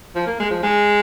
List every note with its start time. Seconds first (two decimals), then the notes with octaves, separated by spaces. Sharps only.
0.15 F3
0.27 A#3
0.39 G#3
0.50 F3
0.63 G#3